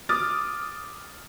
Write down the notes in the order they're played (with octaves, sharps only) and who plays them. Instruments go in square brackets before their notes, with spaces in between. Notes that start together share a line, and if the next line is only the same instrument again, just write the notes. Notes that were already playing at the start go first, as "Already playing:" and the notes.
[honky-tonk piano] D6 D#6 F6 A6